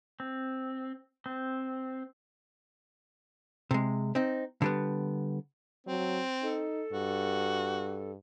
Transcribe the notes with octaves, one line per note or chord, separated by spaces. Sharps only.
C4
C4
C3 G#3
C4 D#4
D3 G3 B3
F#3 C4
D#4 A4
G2 F#4